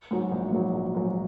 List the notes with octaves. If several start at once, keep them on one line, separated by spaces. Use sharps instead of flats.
G#2 F#3
A#1
G#2 F#3
A#1
G#2 F#3